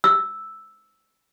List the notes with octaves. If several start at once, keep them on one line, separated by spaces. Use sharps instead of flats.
E6